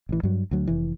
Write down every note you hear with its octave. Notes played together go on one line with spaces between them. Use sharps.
A1 E3
G2 F#3
D2 F#3
F1 E3